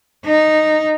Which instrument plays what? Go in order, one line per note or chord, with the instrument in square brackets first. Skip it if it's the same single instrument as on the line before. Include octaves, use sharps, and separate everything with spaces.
[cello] D#4